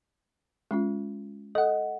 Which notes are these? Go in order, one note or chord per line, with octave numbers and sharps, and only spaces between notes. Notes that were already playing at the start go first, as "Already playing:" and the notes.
G#3 C#4 F4
A4 D#5 F#5